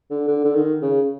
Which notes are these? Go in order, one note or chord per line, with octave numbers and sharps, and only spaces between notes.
D3
D3
D3
D#3
C#3